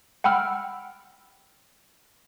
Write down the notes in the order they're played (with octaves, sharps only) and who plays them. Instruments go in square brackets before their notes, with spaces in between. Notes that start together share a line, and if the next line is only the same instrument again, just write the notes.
[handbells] F#5 G5 B5 E6 F6